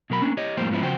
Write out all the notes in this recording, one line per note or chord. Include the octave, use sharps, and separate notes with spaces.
B2 F#3 A#4 B5
A#3 C#4 D4
G4 C#5 D#5
F2 A2 G3 A#3 G4 C5
G#2 F3 B3 C#4 E4
E2 C#3 F3 F#4 C5 G5